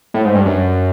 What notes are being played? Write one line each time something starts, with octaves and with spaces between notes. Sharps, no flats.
A2
G#2
G2
F#2